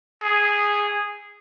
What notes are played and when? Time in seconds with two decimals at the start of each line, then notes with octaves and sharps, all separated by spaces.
0.23 G#4